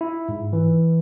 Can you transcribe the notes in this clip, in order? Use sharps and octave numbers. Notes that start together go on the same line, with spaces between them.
E4
G#2
E3